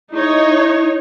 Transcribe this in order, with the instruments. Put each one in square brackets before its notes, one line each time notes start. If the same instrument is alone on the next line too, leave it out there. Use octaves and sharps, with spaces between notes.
[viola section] D#4 C#5 [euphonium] E4